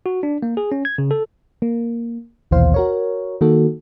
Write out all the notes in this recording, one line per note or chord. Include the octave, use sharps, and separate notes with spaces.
F#4
D4
A#3
G#4
C#4
G#6
C#3
A4
A#3
A#1 D#2 B2 E3 C5 F5
F#4 A#4 C#5
D#3 A#3 F#4 A4